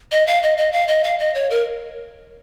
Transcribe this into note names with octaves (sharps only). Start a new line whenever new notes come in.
D#5
F5
D#5
D#5
F5
D#5
F5
D#5
C#5
A#4